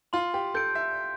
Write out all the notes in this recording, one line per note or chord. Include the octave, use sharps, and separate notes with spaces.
F4 C6
G4
A4 G6 D7
E5
G6